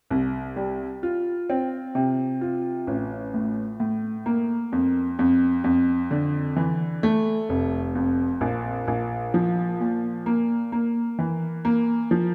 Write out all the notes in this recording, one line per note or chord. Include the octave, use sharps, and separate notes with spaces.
C2
G3
F4
C4
C3
F4
A1
A2
A2
A#3
F2
F2
F2
D3
E3
A3
F1
F2
A#1
A#1
F3
A#2
A#3
A#3
E3
A#3
F3